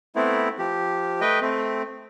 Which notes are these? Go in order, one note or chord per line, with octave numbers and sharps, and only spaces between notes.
A3 B3 C4 E4
F3 G4
A3 B4 D#5 G5
A3 C4